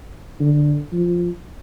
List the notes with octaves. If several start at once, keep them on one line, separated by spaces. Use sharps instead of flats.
D3
F3